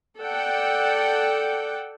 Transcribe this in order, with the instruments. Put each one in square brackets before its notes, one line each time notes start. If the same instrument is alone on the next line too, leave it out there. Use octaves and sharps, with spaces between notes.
[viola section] A4 D5 F#5 G5